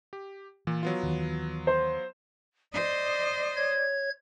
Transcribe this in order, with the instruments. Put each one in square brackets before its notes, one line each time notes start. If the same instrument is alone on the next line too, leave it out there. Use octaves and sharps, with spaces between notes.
[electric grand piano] G4
[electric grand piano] A#2 [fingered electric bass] E3
[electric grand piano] F#3 B3 F4
[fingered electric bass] D#2 D#3 E3
[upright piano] C5
[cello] C5 D#5 [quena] D5
[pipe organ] C#5 G#6